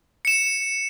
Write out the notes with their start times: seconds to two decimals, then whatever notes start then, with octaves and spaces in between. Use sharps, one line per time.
0.25 C#7 E7